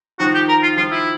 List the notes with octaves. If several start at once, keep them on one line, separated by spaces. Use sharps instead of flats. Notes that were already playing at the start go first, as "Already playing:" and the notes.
D#3 F3 F#4
G4
A#4
F4
D#3 F3 F4
E4